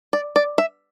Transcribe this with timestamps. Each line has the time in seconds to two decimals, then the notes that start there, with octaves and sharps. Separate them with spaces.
0.13 D5
0.36 D5
0.58 E5